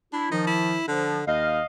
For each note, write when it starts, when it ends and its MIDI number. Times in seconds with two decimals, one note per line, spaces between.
0.13 0.28 62
0.13 0.29 64
0.32 0.75 51
0.32 0.75 53
0.32 0.44 63
0.47 0.83 64
0.88 1.26 50
0.88 1.18 53
1.27 1.60 39
1.27 1.65 75
1.27 1.65 77